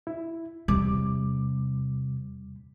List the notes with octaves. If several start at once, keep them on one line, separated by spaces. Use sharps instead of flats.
E4
E2 C3 G3 D6